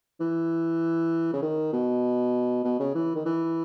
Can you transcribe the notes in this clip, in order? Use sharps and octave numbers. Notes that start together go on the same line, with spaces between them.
E3
C#3
D#3
B2
B2
C#3
E3
D#3
E3